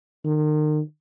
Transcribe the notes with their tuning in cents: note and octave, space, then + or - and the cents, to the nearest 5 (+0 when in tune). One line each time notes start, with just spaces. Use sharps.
D#3 -35